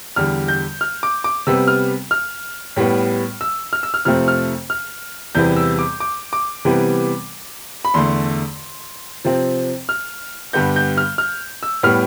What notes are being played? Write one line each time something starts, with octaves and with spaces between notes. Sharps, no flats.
E2 D3 G3 F6
G6
F6
D6
D6
C3 G3 B3 E6
F6
F6
A2 G3 B3
E6
F6
E6
F6
F2 C3 F3 A3 C4 F6
F6
F6
E2 C3 E3 G3 B3 G6
E6
D6
D6
D6
C3 E3 G3 B3
B5
E2 D3 A3 C6
C3 F3 C4
F6
G2 D3 G3 B3 G6
G6
F6
F6
E6
A2 G3 B3 F6